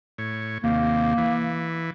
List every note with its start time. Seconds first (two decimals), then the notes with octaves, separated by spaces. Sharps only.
0.18 A2 C#5
0.64 D#2 C3 A#3
1.17 E3